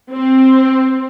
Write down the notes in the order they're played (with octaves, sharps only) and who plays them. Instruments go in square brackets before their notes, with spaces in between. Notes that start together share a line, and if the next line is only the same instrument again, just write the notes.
[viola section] C4